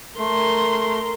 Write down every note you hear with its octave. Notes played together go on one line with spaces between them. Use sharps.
A3 A#4 C6